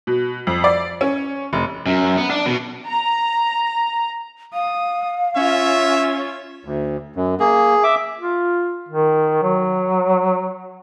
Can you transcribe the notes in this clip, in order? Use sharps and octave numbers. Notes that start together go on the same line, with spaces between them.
B2
F2
D5
C#4
F1
F#2
B3
D4
B2
A#5
F5 D#6
C#4 F4 C#5 E5
D2
F#2
A#3 G#4
E5 D6
F4
D#3
F#3